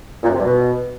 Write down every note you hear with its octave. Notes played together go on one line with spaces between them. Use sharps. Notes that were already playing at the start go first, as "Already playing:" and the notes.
A#2
F#2
C3
G2
B2